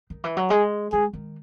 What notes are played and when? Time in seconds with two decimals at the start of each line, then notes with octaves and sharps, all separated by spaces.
0.10 D#3
0.24 E3
0.37 F#3
0.50 G#3 G#4
0.92 G#3 G#4
1.13 D#3